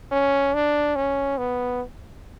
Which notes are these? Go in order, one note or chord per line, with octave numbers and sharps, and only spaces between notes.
C#4
D4
C#4
B3